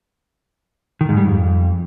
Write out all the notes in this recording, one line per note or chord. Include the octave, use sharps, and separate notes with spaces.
D#3
G#2
G3
F2